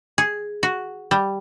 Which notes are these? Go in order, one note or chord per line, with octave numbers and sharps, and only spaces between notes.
G#4
F#4
G3